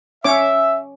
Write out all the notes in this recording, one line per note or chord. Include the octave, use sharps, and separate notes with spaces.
C#4 C#5 E5 D6